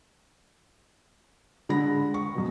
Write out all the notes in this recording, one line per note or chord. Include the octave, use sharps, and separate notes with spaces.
D3 G#3 B5 A#6
C#6
F#2 B2